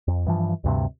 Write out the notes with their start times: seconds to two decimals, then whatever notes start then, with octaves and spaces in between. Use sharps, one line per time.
0.08 F2
0.26 G2 E3 F3
0.64 D2 G2 C3